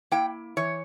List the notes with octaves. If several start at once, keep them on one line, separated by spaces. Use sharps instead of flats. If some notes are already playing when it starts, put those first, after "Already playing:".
A#3 E4 G5
E3 C#5